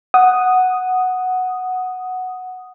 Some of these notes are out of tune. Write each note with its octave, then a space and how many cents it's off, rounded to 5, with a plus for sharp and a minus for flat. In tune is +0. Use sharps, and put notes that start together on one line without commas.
F#5 +0 D#6 +0